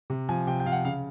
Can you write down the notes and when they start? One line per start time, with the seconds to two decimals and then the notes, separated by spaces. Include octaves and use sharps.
0.10 C3
0.29 F3 G#5
0.47 C3 G5
0.60 G5
0.66 F3 F5
0.72 F#5
0.85 C#3 F5